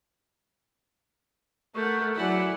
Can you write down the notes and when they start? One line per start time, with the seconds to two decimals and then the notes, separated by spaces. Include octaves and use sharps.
1.75 A3 A#4 F#5 C#6 G6
2.16 F#3 E4 G#4 D5 F#5 G#5